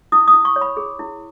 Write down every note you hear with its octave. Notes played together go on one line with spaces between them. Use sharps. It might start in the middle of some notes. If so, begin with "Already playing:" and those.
E4 D#6
D#6
E4
C#6
C#5
B5
G#4
E4